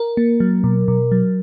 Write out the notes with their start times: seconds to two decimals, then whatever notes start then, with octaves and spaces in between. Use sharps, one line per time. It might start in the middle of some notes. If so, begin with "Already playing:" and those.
Already playing: A#4
0.17 A#3
0.40 F#3
0.64 B2
0.88 B2
1.12 F#3